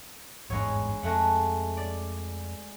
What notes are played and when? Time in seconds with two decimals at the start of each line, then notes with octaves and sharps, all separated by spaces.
0.50 G#1 E2 G2 G#3 B3 C#5
1.03 F2 G#3 A3 F#5
1.77 D5